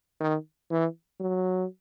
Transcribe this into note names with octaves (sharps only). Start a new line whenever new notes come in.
D#3
E3
F#3